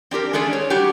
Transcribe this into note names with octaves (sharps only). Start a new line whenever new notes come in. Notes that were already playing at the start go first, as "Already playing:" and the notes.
C4 D4 G4 A#4
G#3 A3 C#4 D4 G#4
C#5
G3 D4 F#4 G4